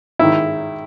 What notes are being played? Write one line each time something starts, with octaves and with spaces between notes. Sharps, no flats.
G#2 D#3 E4